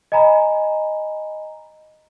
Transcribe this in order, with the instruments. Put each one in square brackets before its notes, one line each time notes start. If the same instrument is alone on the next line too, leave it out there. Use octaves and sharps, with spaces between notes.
[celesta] D#5 G#5 A#5 B5